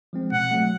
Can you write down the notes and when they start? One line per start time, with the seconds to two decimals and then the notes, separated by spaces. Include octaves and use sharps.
0.13 F3 G#3 C4
0.32 B2 F#5
0.51 F#3 A3